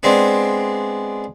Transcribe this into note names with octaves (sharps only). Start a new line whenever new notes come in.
G#3 B3 C4 D4